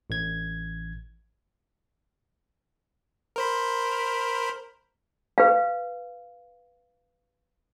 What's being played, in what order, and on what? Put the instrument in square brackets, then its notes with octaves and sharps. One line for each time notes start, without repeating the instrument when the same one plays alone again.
[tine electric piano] A1 G#6
[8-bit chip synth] A#4 C5 B5
[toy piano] B4 F5